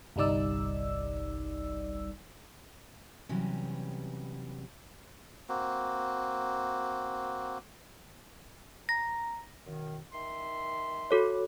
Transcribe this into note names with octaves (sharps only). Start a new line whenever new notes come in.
G1 C2 G3 D#4 D5 E6
C3 E3 F#3 G3 B3 C#4
A#3 C4 F#4
A#5 A#6
F#2 B2 D#3
D#3 E5 C6
F#4 A4 C#5